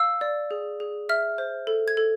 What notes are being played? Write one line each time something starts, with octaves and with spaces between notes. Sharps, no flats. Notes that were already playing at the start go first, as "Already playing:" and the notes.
Already playing: F5 E6
D5
G#4
G#4
E5 F6
C5
A4
G#6
A4